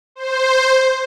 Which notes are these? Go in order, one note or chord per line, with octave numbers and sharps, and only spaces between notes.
C5